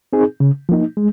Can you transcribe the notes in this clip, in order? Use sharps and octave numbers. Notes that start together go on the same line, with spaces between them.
C4 D#4 G#4
C#3
F3 A#3 D#4
G#3